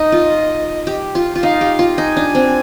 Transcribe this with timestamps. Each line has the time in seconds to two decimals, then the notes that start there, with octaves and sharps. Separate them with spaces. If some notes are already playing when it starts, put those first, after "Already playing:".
Already playing: D#4 D#5
0.12 F4
0.87 G4
1.15 F4
1.35 F4
1.43 D#4 F5
1.61 G4
1.79 F4
1.98 D#4 G#5
2.16 D4
2.35 C4